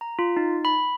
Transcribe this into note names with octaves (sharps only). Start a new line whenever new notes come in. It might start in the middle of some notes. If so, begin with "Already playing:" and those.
A#5
F4
D#4
B5